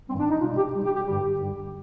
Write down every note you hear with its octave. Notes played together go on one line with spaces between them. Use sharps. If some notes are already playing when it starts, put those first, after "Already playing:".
G2 D#3 G3 C4
D4
D#4
B2 G3 F4
G4
B2 G3
G4
G4
G2 D3 G3 G4
G2 D3 G3